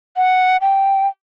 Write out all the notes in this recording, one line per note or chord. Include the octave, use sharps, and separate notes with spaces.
F#5
G5